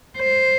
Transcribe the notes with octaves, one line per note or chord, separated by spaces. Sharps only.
C5